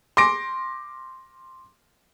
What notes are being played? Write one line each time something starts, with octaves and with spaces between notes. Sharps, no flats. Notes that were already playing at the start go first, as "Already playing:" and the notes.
C6 D6 A#6 D7